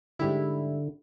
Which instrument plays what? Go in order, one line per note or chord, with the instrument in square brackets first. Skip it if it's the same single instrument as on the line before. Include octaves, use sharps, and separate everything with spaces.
[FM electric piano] G#2 G3 E4 [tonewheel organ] D3